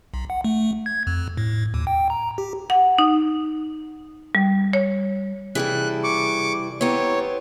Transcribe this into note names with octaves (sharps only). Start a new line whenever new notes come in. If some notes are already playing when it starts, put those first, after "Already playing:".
B1
F#5
A3
G#6
F2
A2
D#2
G5
A#5
G4
F#5
D#4
G3
C#5
C3 E3 G3 G#4 A4 F#6
C#6 D6
B3 C4 E4 G4 C#5 A#5